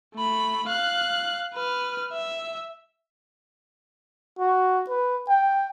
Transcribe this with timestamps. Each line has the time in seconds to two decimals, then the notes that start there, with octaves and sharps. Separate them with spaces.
0.15 A3 B5
0.68 F5 F#6
1.54 B4 F6
2.13 E5
4.39 F#4
4.89 B4
5.29 G5